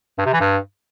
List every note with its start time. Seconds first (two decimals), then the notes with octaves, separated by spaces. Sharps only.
0.18 G2
0.26 C3
0.33 E3
0.40 G2